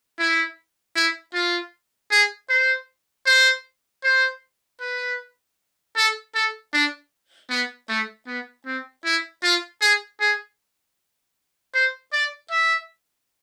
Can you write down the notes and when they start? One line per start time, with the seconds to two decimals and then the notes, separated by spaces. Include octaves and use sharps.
0.19 E4
0.95 E4
1.34 F4
2.11 G#4
2.49 C5
3.26 C5
4.04 C5
4.81 B4
5.96 A4
6.35 A4
6.73 D4
7.50 B3
7.89 A3
8.27 B3
8.66 C4
9.05 E4
9.43 F4
9.81 G#4
10.20 G#4
11.74 C5
12.12 D5
12.51 E5